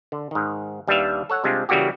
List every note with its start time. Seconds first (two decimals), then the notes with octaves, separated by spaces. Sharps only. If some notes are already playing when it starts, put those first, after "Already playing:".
0.12 D3
0.31 G#2 D#3
0.87 D#2 G3 D4 B4 E5 F5
1.30 A4 C#5 F#5
1.44 C3 G3 G#3 D4 F4
1.69 C#3 E3 G3 A#3 F#4 G4